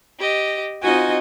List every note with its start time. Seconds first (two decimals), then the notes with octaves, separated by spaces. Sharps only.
0.19 G4 D#5
0.82 C4 D#4 F4 F#4 D#5 G#5